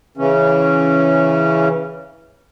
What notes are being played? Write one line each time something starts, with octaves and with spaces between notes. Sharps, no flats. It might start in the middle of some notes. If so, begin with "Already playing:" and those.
C#3 E3 C#4